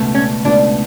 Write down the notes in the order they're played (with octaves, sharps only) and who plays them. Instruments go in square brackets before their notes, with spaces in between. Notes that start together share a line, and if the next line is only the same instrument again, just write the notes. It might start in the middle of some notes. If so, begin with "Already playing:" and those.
Already playing: [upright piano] C#2 B2 A3
[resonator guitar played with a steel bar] C#4
[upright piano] C#2 B2 A3 [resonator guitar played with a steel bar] D4